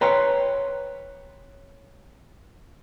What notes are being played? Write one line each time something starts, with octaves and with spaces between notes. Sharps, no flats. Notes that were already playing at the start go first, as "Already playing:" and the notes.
B4 C#5 G5 A#5 C6